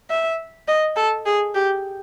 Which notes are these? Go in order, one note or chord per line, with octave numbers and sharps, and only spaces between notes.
E5
D#5
A4
G#4
G4